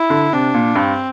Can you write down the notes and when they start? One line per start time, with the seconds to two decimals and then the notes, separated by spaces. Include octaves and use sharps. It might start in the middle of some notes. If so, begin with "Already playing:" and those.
Already playing: E4
0.10 D3
0.33 C3 D4
0.54 A#2
0.76 G2 C4